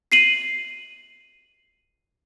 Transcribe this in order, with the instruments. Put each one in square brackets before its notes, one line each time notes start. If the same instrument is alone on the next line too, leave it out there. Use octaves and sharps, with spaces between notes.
[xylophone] C7 D#7 F#7